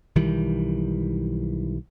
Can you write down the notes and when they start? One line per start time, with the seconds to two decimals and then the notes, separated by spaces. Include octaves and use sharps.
0.16 B1 D#3 E3 G3